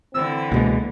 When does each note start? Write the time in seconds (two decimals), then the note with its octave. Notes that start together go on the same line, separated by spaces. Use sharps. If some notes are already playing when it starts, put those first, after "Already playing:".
0.14 D3 E3 C4 E6
0.52 C#2 B2 G#3 A#3